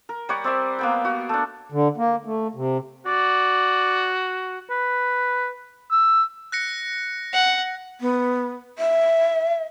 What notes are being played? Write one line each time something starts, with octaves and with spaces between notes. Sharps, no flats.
A#4
G3 G4 C#5 F#5
C4 D5 E5 C6
A#3 B3 G5
F#4
A3 D4
D3
A#3
A3
C3
F#4 D5
B4
E6
F#6 A#6 C#7
F#5
B3
E5